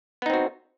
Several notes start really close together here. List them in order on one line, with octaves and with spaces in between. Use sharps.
B3 D#4 C4 F#4